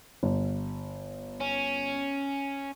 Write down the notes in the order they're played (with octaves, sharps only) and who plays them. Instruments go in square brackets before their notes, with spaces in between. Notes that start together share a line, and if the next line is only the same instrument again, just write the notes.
[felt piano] G1
[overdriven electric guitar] C#4